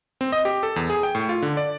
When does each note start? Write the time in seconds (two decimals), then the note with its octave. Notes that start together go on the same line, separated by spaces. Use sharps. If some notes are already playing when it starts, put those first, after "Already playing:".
0.21 C4
0.32 D#5
0.45 G4
0.63 A4
0.76 E2
0.90 G#4
1.03 G5
1.15 A2
1.29 F4
1.42 D3
1.57 D5